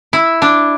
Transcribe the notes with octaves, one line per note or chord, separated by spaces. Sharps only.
E4
D4